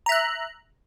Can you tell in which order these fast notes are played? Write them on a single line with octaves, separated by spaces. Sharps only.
A#5 E5 F#6